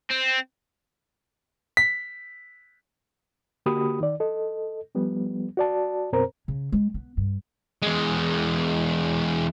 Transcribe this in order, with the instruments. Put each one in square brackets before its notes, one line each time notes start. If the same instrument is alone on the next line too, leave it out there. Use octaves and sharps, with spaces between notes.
[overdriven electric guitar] C4
[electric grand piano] B6
[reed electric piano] D3 A#3 F#4 G4 B5 D#6
D#3 D5
A4 D#5
F3 G3 B3
F#4 D5 A5
F#2 B2 C4 A#4 C5 A#5
[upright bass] C#3
G#3
B3
G2
[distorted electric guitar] E2 G#3